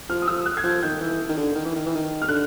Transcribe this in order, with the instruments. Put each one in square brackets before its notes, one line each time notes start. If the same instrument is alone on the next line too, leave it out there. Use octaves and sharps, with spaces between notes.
[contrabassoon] F3 [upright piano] F6
[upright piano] D#6
[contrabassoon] F3 [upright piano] E6
[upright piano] F#6
G#6
[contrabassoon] F3 [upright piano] G6
[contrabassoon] D#3 [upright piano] G6
[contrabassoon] E3
D#3
D3
D#3
E3
D#3
E3
D#3
[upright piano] F6
[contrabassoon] D3 [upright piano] F#6